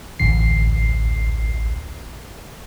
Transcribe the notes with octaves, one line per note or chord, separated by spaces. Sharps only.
A1 D2 C7